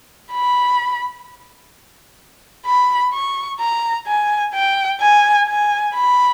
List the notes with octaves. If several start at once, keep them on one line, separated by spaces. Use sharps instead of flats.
B5
B5
C#6
A#5
G#5
G5
G#5
G#5
B5